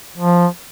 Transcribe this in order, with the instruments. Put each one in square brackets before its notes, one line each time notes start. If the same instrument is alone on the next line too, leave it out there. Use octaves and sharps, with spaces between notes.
[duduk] F3